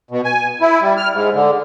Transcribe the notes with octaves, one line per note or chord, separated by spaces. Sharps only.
B2
G#5
E4
G3
F6
G#2
D3